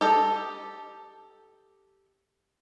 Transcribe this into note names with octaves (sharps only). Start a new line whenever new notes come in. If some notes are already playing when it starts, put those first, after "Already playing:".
G4 A4 D#5